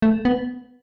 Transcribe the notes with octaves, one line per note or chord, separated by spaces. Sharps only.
A3
B3